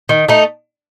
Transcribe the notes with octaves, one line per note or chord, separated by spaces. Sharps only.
D#3
A3 D#4